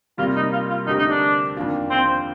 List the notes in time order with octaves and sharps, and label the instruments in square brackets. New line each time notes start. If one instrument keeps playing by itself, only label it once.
[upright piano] C3 G3 A#3 [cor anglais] F4
[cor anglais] D#4
F4
F4
[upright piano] D3 A3 C4 G4 A#4 [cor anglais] D#4
[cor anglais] D#4
D4
[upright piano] F2 D#3 A#3 D4 F4
[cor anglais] C4